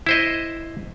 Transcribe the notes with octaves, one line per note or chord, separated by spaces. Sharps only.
E4 C5 D#5